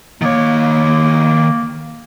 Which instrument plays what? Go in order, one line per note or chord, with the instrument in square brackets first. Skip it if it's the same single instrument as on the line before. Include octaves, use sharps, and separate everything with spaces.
[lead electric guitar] D#3 C#5 [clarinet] A#3